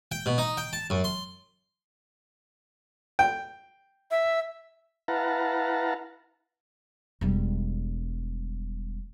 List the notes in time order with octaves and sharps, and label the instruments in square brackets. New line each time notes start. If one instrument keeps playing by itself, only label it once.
[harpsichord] G5
B2
D#4
G5
A5
F#2
C6
[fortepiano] G5
[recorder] E5
[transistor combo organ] E4 B4 F5 F#5 A5 A#5
[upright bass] E1 G3